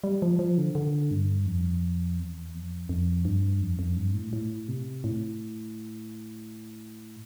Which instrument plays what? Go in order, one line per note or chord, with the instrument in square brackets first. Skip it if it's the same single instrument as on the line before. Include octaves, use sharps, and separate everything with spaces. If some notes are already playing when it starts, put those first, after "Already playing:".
[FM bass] G3
F3
F3
D3
D3
G2
F2
E2
F2
F2
G2
F2
F2
G2
A2
A2
C3
A2